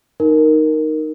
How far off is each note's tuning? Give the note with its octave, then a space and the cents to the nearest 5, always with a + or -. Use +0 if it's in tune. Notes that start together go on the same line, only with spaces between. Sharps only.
D#4 -5 A#4 +0